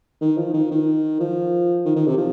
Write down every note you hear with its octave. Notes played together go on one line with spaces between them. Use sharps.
D#3
F3
D#3
D#3
F3
D#3
D#3
C3
F3